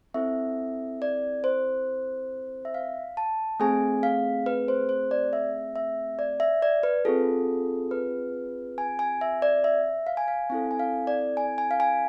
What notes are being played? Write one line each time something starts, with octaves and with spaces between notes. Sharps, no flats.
C4 E4 A4 E5
D5
C5
E5
F5
A5
A3 C4 G#4 G#5
F5
B4
C5
C5
D5
E5
E5
D5
E5
D5
B4
C4 F4 G#4 A4
B4
G#5
G#5
E5
D5
E5
F5
G#5
F5
C4 E4 A4 G#5
G#5
F5
D5
G#5
G#5
F5
G#5